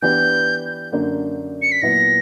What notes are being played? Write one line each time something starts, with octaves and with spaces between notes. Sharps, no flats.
E3 B3 D4 G4 B4 G6
F#2 D3 A#3 D4
C#7
B6
A#2 F#3 B3 E4 B4 A#6